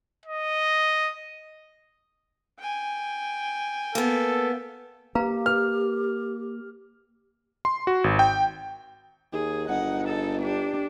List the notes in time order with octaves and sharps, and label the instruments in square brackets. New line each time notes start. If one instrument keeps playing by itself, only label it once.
[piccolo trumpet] D#5
[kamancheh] G5 G#5
[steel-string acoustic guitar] A#3 B3 [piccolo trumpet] A4
[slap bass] A#3 [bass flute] G4 [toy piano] B4 F5 A#5
[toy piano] B4 [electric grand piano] F6
[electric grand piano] C6
F#4
G#1
G5
[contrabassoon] D#2 [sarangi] G#4
[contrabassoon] G1 [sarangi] D#4 [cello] F#5
[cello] A4
[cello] D4 [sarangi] G4